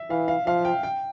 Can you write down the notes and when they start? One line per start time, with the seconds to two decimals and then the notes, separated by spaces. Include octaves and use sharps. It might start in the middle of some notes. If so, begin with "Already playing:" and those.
Already playing: E5
0.10 E3 F5
0.28 F5
0.46 F3 F5
0.65 G5
0.83 G5